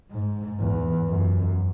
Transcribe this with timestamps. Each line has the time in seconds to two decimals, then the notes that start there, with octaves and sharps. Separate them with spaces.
0.11 G#2
0.59 E2
1.09 F#2